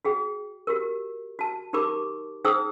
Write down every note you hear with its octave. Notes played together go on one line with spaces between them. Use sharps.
F#4 G#4 G5
F#4 G4 A#4
F#4 A5
D#4 G4 A#4 B5 D6
D#4 G#4 C5 G5 D#6 E6